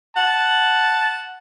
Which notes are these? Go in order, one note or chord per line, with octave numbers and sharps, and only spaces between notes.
F#5 A5